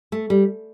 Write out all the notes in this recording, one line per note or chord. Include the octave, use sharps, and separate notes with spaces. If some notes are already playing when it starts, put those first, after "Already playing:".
A3
G3